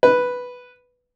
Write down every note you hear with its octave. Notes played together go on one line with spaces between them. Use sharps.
B4